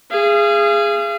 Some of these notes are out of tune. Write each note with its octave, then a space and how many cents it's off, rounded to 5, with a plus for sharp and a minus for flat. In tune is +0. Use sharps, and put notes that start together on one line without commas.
G#4 -10 F5 -40